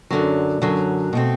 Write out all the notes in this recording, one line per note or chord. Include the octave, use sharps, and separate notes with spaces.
F#2 D3 F#3
F#2 D3 F#3
B2 A3 C4